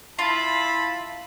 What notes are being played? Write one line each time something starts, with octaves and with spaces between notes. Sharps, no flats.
E4 F4 A5 B5